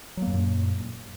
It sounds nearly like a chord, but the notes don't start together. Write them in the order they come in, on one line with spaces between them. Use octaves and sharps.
F#3 A#3 F#2 A#2